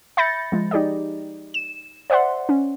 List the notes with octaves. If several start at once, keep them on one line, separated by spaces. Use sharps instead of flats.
E5 B5 G6 A6 A#6 C#7
F3 G#3
D#4 G4 G#4 D5 D#5
E7
C5 D5 E5 F#5 C6
C#4